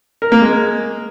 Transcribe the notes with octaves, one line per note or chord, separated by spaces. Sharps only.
A#4
A#3
G#3